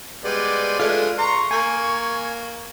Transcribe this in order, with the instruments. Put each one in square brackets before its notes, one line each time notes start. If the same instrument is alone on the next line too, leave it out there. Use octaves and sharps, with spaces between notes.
[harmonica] G3 G#3 B3 [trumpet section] C5 D5
[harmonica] G#3 A3 D4 [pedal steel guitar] F4 B4
[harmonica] A#5 [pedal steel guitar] C6 [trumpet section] C#6
[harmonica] A#3 [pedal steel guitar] G#5